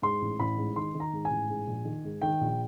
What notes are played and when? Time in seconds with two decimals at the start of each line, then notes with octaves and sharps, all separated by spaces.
0.02 G#2 C6
0.21 A1
0.40 A1 B5
0.57 G#2
0.76 D#3 C6
0.95 D#3
1.00 A#5
1.13 G#2
1.25 G#5
1.31 A1
1.49 G#2
1.67 A#1
1.85 D#3
2.04 G#2
2.22 D#3 G5
2.41 A#1